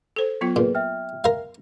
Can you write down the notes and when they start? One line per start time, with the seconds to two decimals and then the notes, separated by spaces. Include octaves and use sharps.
0.16 A4 C5
0.41 F#3 B3 F4
0.56 A#2 G#4 B4
0.75 E5 G5 F6
1.24 A#4 F5